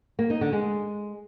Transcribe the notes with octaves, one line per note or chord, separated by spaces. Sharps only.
A#3
D#4
D3
G#3